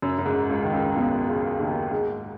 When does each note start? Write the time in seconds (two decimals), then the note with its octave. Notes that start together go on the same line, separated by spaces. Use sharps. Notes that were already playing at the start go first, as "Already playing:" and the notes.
0.02 F#2
0.19 F#2
0.26 G#2
0.50 C#2 C#3
0.64 D#3
0.73 C#2 C#3
0.96 B1 B2
1.28 C#2 C#3
1.60 D#2 D#3
1.91 G#2 G#3